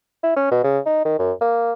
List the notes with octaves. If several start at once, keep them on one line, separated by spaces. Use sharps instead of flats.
E4
C#4
B2
C#3
D#4
D#3
F#2
A#3